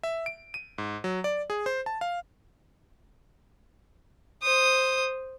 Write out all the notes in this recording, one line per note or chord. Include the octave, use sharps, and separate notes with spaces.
E5
D7
D#7
G#2
F#3
D5
G#4
C5
A5
F5
C5 D#6